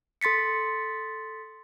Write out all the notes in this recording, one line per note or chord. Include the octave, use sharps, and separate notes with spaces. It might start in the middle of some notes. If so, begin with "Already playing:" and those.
A4 C6 A6 B6 C#7